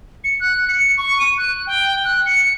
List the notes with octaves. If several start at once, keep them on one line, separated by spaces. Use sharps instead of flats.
C#7
F#6
C#7
C#6
D#7
F#6
G5
F#6
C#7